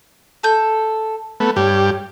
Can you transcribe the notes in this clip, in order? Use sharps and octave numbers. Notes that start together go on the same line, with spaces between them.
A4 G6
A3 B3
G2 G4 C#5